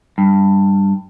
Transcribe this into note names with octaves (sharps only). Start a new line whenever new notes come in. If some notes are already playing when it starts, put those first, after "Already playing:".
G2